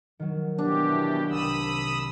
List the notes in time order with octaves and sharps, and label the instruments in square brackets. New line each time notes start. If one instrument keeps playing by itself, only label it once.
[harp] D#3 F#3
[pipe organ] B2 E3 G4 [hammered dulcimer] D4
[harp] C2 [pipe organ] B5 D#6 E6